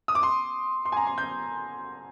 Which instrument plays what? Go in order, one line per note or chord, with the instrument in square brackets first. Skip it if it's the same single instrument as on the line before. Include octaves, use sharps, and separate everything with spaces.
[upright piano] D#6
D6
C6
C6
G#5
A#5
C6
G6